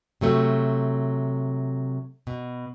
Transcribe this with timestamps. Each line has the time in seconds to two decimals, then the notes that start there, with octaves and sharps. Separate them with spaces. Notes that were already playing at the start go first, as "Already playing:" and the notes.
0.21 C3 F#3 A3
2.27 B2